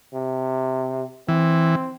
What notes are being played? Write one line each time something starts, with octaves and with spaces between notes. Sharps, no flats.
C3
E3 C4